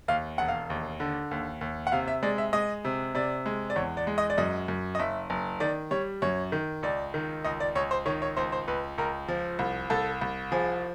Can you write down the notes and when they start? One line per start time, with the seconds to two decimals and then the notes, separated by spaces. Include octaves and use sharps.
0.08 D#2 F5
0.38 E1 F#5
0.48 F5
0.70 D#2
1.00 D3
1.31 D#2
1.61 D#2
1.87 F#5
1.92 C3 F5
2.08 E5
2.23 G#3 D5
2.38 E5
2.53 G#3 D#5
2.85 C3
3.15 C3 D5
3.46 G#3
3.70 D5
3.76 E2 C#5
3.97 D5
4.07 G#3
4.18 D#5
4.30 D5
4.38 F#2 D#5
4.68 F#2
4.95 D#5
4.99 F#1 E5
5.30 F#1
5.60 D#3 D5
5.91 G3 C#5
6.22 F#2 C#5
6.52 D#3
6.83 C#2 D5
7.14 D#3
7.44 C#2 D#5
7.60 D5
7.75 C#2 C#5
7.91 C5
8.06 D#3 C#5
8.22 C#5
8.37 C#2 C5
8.52 C5
8.68 C#2 B4
8.98 C#2 A#4
9.28 F3
9.59 C2
9.90 C2 A4
10.21 C2
10.51 F3 G#4